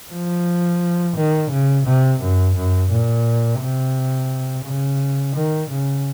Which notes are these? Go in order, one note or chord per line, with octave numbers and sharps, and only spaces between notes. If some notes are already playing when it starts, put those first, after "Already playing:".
F3
D#3
C#3
C3
F#2
F#2
A#2
C3
C#3
D#3
C#3